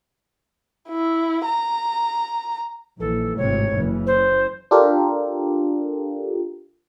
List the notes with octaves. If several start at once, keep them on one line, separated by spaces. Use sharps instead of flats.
E4
A#5
A#1 E3 A4
G#1 A2 C3 C#5
F#1 C#3 E3
C5
D4 F4 G4 A4 A#4